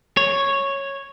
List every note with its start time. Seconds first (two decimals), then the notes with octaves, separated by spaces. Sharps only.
0.17 C#5